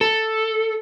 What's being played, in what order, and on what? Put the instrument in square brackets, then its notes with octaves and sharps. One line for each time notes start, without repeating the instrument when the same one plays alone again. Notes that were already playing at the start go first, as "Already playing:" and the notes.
[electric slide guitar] A4